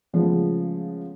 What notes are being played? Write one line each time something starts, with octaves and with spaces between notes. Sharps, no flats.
C#3 F3 G#3 A3 B3